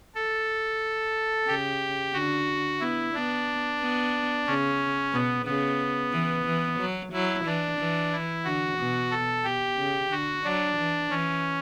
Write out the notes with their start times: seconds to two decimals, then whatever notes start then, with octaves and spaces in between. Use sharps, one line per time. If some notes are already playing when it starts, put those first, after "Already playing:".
0.15 A4
1.47 C#3 G4
2.13 D3 F#4
2.80 B3 E4
3.14 B3 D4
3.80 B3
4.47 C#3 C#4
5.13 B2 B3
5.45 C#3 B3
6.12 E3
6.45 E3
6.80 F#3
7.13 F#3 E4
7.45 E3 D4
7.78 E3
8.12 E4
8.45 D3 F#4
8.78 B2
9.11 A4
9.44 B2 G4
9.77 C#3
10.11 D3 F#4
10.44 F#3 D4
10.78 E3
11.10 E3 C#4